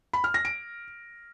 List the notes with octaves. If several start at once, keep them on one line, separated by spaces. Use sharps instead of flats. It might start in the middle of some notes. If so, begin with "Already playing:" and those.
B5
F6
A#6
D7